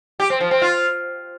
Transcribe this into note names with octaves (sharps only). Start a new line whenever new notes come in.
G4
C4
F3
C4
F4